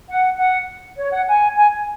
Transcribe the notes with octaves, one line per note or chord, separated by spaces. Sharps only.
F#5
F#5
C#5
F#5
G#5
G#5